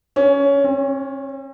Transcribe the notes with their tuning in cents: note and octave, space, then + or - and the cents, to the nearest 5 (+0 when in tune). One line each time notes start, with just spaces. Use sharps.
C#4 +15
C#4 -45